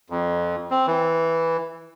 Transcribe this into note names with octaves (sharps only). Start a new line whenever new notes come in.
F2
C4
E3